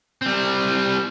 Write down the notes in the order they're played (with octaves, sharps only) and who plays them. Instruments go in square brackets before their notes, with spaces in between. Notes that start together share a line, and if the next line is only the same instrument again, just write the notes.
[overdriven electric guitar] G3 C4